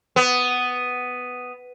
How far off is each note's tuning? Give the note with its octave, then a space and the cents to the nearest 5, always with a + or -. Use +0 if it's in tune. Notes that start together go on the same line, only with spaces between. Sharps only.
B3 +10